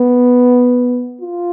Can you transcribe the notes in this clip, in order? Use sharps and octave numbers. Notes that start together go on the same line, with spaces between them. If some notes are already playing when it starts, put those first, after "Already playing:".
Already playing: B3
F4